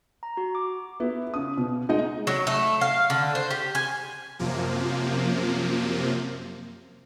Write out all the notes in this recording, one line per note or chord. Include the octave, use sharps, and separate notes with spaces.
A#5
F#4
D6
B3 E4
C#3 D#6
B2
G#3 D#4 D#5
F#3
A3
F5
D3
C5
G4
G#5
F#2 C3 F3 A#3